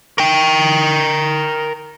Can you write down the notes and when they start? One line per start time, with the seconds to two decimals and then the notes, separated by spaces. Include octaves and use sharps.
0.18 A#4 G5